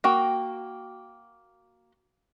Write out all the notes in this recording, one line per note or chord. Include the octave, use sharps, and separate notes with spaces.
A#3 F#4 G5